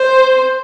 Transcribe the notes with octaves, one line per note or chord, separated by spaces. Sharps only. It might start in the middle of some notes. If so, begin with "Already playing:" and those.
Already playing: C5